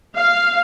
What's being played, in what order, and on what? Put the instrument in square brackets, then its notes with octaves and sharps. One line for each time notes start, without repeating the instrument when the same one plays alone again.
[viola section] F5